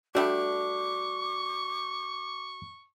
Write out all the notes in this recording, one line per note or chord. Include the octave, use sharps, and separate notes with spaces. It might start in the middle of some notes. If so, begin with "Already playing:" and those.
G3 A3 D4 F#4 C#6 D6